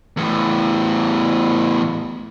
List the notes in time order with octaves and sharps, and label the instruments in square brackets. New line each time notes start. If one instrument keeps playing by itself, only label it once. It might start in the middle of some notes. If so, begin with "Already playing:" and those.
[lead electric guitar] E2 A2